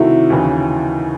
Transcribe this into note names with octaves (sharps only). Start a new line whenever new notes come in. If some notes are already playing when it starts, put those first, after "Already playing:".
Already playing: C3 D#3 A3 E4 F#4
D#2 C#3 E3